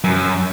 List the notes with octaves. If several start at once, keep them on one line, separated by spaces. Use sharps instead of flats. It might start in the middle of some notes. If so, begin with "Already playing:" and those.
F#2